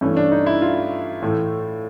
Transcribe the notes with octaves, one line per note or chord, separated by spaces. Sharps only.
G2 E3 A3 C#4
D4
D#4
E4
F4
A2 E3 A3